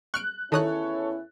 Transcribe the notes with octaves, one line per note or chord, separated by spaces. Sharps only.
C#6 F6 F#6 D7
E2 D#3 C#4 E4 A4 C#5 D#6 F#6